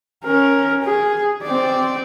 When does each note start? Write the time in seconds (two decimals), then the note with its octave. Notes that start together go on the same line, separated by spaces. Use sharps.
0.25 C#4 A#4
0.83 G#4
1.43 C4 D5